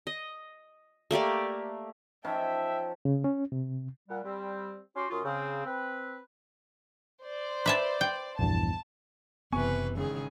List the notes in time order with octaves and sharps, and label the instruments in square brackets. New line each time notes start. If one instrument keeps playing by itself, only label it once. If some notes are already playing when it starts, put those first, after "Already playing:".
[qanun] D#5
A3 A#3 G4 D5
[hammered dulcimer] F3 C#4 D#4 [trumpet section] E5 [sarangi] G5 [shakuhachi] A5
[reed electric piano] C#3
C#4
C3
[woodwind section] A#2 G3 F#5
G3 C4
C#4 F#4 G4 C6
F#2 F4 D#5 C#6
C#3 C4
C4 B4
[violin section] C5 D5
[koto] B4 E5 A5
G5
[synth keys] A#1 E2 G2 [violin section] A5
[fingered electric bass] F#1 B3 [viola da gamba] C3 E3 B4 [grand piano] G#5 C#6
[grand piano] G#1 [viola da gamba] C#3 G#4